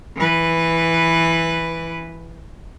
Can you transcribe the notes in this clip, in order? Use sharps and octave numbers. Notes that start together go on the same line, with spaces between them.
E3 B4